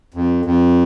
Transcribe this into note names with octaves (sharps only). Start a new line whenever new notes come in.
F2
F2